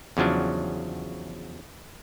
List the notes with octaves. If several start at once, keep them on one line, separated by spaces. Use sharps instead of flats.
E2 C#3 F3 F#3 D4